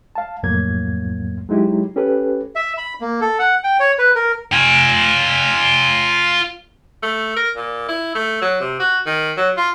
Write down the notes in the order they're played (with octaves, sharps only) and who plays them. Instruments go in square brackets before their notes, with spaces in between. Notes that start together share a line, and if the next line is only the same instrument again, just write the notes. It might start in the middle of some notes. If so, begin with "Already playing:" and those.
[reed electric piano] F5 A5
C2 F2 A2 F#3 A#3 G#6
F#3 G#3 D#4 E4 G4
C#4 G4 A4 B4
[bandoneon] E5
B5
A#3
A4
F#5
G5
C#5
B4
A#4
[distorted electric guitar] F4 G#5
[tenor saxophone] A3
A#4
A#2
E4
A3
F#3
C3
F#4
D#3
F#3
F4